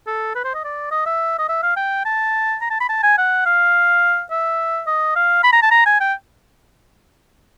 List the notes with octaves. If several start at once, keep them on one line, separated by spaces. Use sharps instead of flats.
A4
B4
C5
D#5
D5
D#5
E5
D#5
E5
F5
G5
A5
A#5
A5
B5
A5
G#5
F#5
F5
E5
D#5
F5
B5
A#5
A5
A#5
G#5
G5